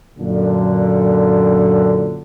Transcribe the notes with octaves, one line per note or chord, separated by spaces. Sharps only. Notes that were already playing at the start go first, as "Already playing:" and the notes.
F#2 A#2 D3